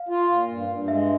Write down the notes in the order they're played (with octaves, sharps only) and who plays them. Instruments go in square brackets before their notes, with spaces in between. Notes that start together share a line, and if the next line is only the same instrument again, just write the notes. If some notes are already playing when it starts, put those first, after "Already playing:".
Already playing: [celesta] F5
[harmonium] F4
A#2
G2
G2
[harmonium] G#3 [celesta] E5